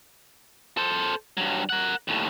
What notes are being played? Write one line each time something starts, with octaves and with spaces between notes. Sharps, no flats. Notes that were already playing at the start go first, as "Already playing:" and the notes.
A4 C5
G2 F#3
A#4 F#5
D#2 A2